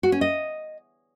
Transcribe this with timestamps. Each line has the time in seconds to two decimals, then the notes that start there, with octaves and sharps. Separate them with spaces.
0.03 F#4
0.12 C#4
0.21 D#5